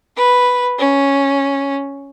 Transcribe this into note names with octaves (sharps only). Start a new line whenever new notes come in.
B4
C#4